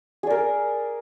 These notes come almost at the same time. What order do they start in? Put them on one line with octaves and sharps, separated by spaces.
G#4 D5 A#4